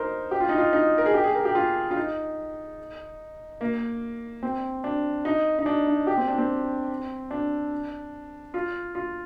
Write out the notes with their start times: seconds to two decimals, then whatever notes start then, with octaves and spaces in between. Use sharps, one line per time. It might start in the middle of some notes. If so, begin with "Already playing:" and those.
Already playing: D#4 A#4 C5
0.31 G4
0.40 F4
0.49 D#4
0.58 F4
0.73 D#4
0.98 A#4
1.06 G#4
1.14 G4
1.24 G#4
1.35 A#4
1.45 G4
1.55 F4
1.91 F4
1.97 D#4
3.61 A#3
4.43 C4
4.84 D4
5.25 D#4
5.59 D#4
5.66 D4
5.87 D#4
6.07 G4
6.17 C4
6.28 D4
6.38 C4
7.31 D4
8.54 F4
8.95 F4